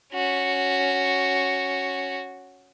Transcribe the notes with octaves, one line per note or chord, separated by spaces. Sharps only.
C#4 F#4